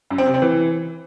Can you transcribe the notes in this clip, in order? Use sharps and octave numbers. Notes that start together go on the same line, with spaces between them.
F#2
C4
C3
C4
E3